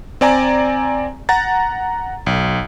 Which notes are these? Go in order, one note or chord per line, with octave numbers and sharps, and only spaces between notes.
C4 D5 G#5 A#5
F#5 A#5 A6
B1